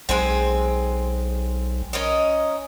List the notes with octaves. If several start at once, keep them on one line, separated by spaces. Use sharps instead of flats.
B1 G#3 C4 G#5
C#4 A#4 D#5